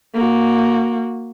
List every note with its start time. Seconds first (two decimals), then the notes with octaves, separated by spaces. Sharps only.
0.14 A#3 F#4